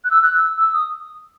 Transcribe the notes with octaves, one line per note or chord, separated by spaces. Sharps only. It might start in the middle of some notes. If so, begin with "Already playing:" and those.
F#6
E6
F#6
E6
E6
D#6